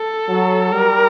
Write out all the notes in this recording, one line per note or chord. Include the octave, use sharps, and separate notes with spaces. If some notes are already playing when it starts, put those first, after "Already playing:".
Already playing: A4
F#3
G3 A#4